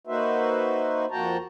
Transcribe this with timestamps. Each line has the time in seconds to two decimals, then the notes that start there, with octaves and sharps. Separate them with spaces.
0.07 A#3 D#4 F#4 B4 C5 E5
1.11 F2 A#3 F#4 G5 A5 A#5